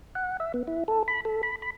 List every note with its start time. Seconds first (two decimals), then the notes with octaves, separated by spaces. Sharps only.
0.15 F#5
0.40 E5
0.54 B3
0.68 E4
0.88 A4
1.08 B5
1.25 A4
1.43 B5
1.62 B5